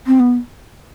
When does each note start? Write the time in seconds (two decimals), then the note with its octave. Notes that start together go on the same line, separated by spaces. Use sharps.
0.07 C4
0.20 B3